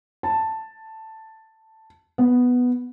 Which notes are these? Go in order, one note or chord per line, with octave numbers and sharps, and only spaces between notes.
A5
B3